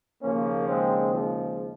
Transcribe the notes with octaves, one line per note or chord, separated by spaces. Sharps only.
D#2 C#3 F3 A#3 C#4
G#3 C4
F3 G#3